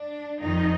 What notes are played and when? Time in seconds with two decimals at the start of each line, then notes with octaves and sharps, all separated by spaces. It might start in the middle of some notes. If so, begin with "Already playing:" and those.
Already playing: D4
0.41 F2 D#3 D#4